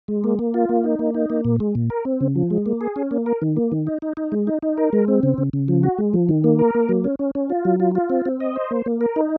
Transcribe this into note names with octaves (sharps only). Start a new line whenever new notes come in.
G#3
A#3
A#3
F4
A#3
D#4
A#3
D#4
A#3
A#2
G#3
A#2
A#4
C4
C#3
F3
G#3
A#3
G#4
C#4
A#3
A#4
D#3
A#3
D#3
D#4
D#4
D#4
G#3
D#4
D#4
A#4
G#3
C4
C#3
C#3
C#3
F3
F#4
G#3
F3
D#3
A#3
A#4
A#3
F#3
C#4
C#4
C#4
F4
F#3
F4
F4
C4
C4
D#5
C5
A#3
A#3
A#4
D#4